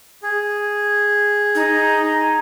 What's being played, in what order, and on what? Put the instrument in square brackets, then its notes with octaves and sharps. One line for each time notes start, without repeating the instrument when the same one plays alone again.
[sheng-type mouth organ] G#4
[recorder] D#4